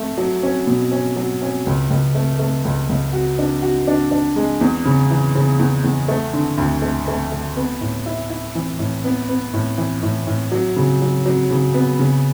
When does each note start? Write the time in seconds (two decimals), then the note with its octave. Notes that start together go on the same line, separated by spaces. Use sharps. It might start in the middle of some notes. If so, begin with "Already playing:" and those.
Already playing: A3
0.17 F#3
0.43 C#4
0.67 B2
0.91 C#4
1.16 F#3
1.42 C#4
1.66 C#2
1.90 C#2
2.15 A3
2.39 A3
2.65 C#2
2.89 C#2
3.13 F#4
3.39 D4
3.62 F#4
3.87 D4
4.11 D4
4.36 G#3
4.61 E2
4.85 C#3
5.10 E3
5.35 C#3
5.59 E2
5.84 E2
6.08 A3
6.33 D3
6.58 D2
6.82 A3
7.08 A3
7.32 A3
7.56 B3
7.81 A2
8.06 E4
8.30 E4
8.55 E3
8.79 A2
9.04 B3
9.29 B3
9.53 A2
9.78 E3
10.02 A2
10.27 A2
10.52 F#3
10.76 C#3
11.02 F#3
11.26 F#3
11.51 C#3
11.74 B3
11.99 C#3